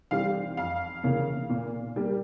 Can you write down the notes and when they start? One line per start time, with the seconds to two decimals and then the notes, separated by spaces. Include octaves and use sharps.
0.11 E3 G3 C4 F5
0.57 F2 F5
1.03 C#3 E3 A#3
1.49 A#2
1.96 G3 A#3